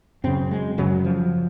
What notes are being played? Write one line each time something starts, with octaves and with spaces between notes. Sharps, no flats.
F#2 C#3 C4
G#3
F#2 C#3 F#3
F3